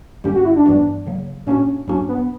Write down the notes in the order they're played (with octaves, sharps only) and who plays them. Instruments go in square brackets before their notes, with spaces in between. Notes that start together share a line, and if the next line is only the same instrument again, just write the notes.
[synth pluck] G2 D3 G3 A#3 C#4 [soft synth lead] G4
[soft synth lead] F#4
E4
D4
[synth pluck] G2 E3 G3 B3 F#4
C#3 F#3 A#3
[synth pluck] A#2 A#3 D4 F#4 [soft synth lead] C#4
[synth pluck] G2 F#3 A#3 D4 F#4 [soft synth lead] C#4
[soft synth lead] B3